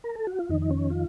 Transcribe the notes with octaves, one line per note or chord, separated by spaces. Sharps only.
A#4
A4
F#4
F4
F2 D#3 D#4
D#4
C#4
F4